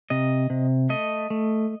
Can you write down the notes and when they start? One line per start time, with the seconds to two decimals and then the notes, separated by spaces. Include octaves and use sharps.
0.10 C3 D#5
0.50 C3
0.90 A3 D#5
1.30 A3